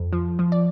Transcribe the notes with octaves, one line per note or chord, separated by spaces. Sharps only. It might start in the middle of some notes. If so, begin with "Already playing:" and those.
Already playing: F2
F3
F3
D5